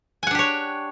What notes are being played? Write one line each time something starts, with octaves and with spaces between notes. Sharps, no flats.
D4 G4 C#5 F#5 G#5